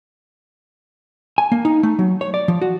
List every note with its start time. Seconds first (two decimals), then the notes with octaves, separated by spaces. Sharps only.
1.38 G#5
1.52 A#3
1.65 D#4
1.83 A3
1.99 F#3
2.21 C#5
2.34 D5
2.48 F3
2.62 F#4